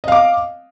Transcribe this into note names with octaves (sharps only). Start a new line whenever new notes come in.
D#5 F5 D6